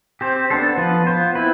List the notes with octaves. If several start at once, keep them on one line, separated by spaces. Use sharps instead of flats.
C4 G4 C5
B3 D4 A4 C5
F3 B3 F4 B4
B3 F4 C5
C4 E4 B4